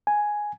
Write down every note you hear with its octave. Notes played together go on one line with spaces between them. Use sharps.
G#5